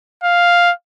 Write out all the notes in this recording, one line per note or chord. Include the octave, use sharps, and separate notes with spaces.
F5